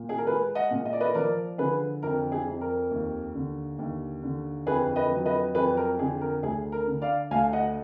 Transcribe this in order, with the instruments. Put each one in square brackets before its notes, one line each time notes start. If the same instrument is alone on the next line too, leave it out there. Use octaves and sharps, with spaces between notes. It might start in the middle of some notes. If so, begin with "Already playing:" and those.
Already playing: [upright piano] A#2
G#4
A#4
G#3 G#4 B4
D#5 F#5
A#2
D#5
D5
B4 D#5
F3 A#4 D5
D3 G#4 B4
F2 A#4
G#4
F2
A#4
D#2
D3
D#2
D3
F2 G#4 B4
B4 D#5
F#3
B4 D#5
F2 G#4 B4
A#4
D3 G#4
A#4
D2 G#4
A#4
D3
D5 F5
D2 F5 G#5
D#5 F#5